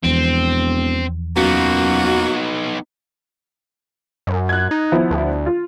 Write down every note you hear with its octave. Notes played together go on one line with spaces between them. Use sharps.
E1 E2 F3 C4
F#2 A#3 B3 D#4 F4 F#4
F#2
F#6 G#6
D#4
F3 B3 E4
D2
F4